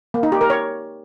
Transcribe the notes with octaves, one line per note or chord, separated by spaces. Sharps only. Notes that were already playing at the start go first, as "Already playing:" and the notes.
A#3
D#4
G4
A#4
C#5